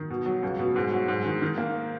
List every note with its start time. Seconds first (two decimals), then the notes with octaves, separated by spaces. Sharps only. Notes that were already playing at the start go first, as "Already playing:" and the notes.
Already playing: D#3
0.10 B2
0.26 F#3
0.43 C#2
0.59 B2
0.76 G#2
0.92 F#3
1.08 G#2
1.25 D#3
1.42 D#3
1.58 A#3